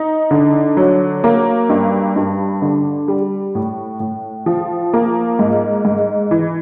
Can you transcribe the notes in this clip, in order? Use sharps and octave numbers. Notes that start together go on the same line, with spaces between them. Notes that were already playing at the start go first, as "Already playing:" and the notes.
Already playing: D#4
D3
F#3
A#3
G2
G2
D3
G3
A2
A2
F3
A#3
G#2
G#2
E3